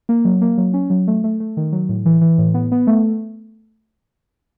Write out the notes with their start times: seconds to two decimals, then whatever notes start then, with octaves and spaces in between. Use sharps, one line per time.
0.09 A#3
0.25 F#3
0.42 A#3
0.58 F#3
0.74 C#4
0.90 F#3
1.08 A3
1.24 A3
1.40 A3
1.57 D#3
1.72 F#3
1.89 A2
2.06 E3
2.21 E3
2.38 A2
2.54 B3
2.72 B3
2.87 A3